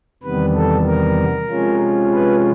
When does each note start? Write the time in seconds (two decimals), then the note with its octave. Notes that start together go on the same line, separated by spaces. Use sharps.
0.23 E2 C3 D#3 G3 B3 B4
0.55 A4
0.86 A#4
1.49 C3 F3 G#3 C#4 F4
2.13 B4